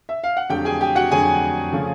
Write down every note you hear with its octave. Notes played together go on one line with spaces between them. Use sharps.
E5
F5
F#5
F2 D3 F#3 A3 G4 G5
G#4 G#5
G4 G5
F#4 F#5
F2 D3 F#3 A3 G#4 G#5
C#3 F3 A3